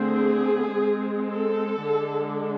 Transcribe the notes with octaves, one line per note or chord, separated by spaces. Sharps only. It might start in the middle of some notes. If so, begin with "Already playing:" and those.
Already playing: D3 A3 C4 G#4
G#3 C4
A4
D3 G#3 D4